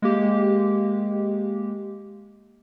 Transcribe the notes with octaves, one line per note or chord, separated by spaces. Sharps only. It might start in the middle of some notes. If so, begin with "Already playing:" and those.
G#3 A#3 G4